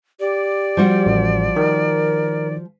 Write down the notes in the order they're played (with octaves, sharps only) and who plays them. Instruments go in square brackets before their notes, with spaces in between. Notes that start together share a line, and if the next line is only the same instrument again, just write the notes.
[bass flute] G4 [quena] D5
[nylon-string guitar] F3 G3 F#4
[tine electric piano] A1
[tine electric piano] D#3 [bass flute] A#4